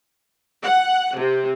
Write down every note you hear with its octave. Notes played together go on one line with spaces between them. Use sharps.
F#5
C3